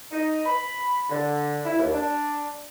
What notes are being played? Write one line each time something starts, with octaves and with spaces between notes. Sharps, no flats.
D#4
B5
D3
E4
D#2
D4